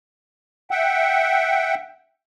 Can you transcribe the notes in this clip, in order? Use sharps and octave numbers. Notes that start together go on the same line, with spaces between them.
E5 F#5 G5